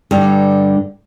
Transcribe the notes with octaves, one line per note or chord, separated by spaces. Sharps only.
G2 D3 G3